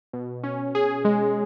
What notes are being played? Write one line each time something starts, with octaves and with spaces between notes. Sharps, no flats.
B2
C#4
G#4
G#3